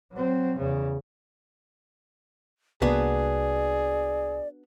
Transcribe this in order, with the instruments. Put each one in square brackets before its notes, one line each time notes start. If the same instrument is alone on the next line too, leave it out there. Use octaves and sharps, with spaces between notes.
[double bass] F#3 C4
E2 C#3
[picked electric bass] C2 A#3 [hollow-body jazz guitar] B3 D4 F#4 [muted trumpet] G#4 [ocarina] D5